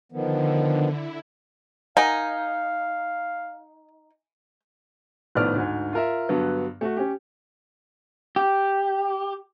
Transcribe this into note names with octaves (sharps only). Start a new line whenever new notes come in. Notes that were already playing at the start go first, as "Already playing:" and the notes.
D3 D#3 F3 B3
E4
D#4 A#4 F5 F#5 G#5 A#5
A#1 A2 D#3 B3 D5 F6
D2 G#2
F4 A#4 E5
G2 D3 F#3 B3
A3 F#4
C#4 G4
G4